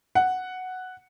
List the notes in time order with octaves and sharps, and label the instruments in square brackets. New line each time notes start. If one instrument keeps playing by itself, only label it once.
[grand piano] F#5